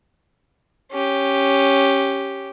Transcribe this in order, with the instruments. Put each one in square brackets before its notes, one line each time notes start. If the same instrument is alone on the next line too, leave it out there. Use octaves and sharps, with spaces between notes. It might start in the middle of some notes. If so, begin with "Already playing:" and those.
[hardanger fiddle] C#4 G4